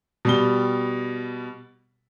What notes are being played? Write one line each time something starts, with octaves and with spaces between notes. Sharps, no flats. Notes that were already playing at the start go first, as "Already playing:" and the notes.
B2 G3 G7